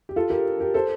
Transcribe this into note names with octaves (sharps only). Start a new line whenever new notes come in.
G4
F4 A4
G4 A#4
G4 A#4
A4 C5